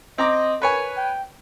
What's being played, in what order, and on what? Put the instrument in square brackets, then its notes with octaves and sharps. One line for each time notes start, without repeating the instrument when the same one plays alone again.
[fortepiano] C4 A#5 D6 [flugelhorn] D#5
[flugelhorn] A#4 [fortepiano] B4 C#5 G#5
[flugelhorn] G5